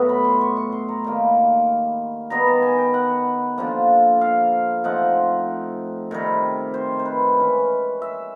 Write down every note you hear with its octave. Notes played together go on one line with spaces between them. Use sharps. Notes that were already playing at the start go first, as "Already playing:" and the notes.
Already playing: A2 F#3 B3
B5
C6
C#6
C#6
C6
A#5
D#3 G3 A#3
D#3 G3 B3 A#5
A5
G#5
G5
F#5
D3 F3 A#3
F5
F3 A3 C4 D#4 F#5
C3 D#3 G3
C5
C5
B4
E3 G#3 C#4
E5